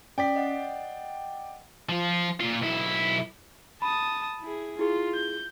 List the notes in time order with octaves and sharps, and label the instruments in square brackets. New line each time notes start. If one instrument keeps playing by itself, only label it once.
[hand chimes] C#4 B6 [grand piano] D5 G5
[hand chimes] D#5 F#5
[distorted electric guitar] F3 F4
A#2 F4
B1 E4
[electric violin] A5 D#6 [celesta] B5
[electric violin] E4 G#4
[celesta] E4 G#4 [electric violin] F4
[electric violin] G6